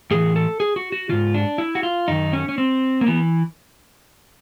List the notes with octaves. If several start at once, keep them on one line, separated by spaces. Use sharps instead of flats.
A2 E3 G#4
A4
G#4
F#4
F#4
G#2 D#3 F4
D4
E4
F#4
F4
F#2 D#3 D#4
C#4
C#4
C4
A#3
E3 B3